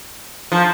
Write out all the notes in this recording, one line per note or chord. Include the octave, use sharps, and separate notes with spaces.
F3